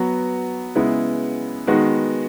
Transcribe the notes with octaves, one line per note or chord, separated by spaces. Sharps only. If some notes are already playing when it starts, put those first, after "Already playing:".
Already playing: F#3 B3 F#4
C#3 G#3 B3 E4
D#3 G#3 B3 F#4